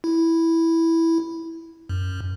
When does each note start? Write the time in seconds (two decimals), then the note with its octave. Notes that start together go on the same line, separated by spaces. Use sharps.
0.04 E4
1.89 F#2